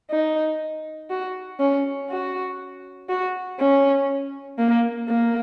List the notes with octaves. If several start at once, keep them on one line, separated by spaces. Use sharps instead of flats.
D#4
F#4
C#4
F#4
F#4
C#4
A#3
A#3